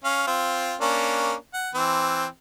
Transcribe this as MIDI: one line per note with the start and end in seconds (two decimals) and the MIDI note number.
0.04 0.26 61
0.04 0.26 77
0.27 0.75 60
0.27 0.75 65
0.81 1.34 58
0.81 1.34 61
0.81 1.34 62
1.54 1.70 78
1.75 2.26 52
1.75 2.26 60